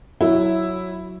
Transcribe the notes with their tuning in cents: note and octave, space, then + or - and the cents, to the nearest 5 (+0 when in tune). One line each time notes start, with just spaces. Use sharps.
F#3 -5 E4 +0